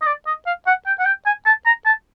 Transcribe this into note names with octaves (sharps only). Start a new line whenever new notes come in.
D#5
D5
D#5
F5
F#5
G5
F#5
G5
G#5
A5
A#5
A5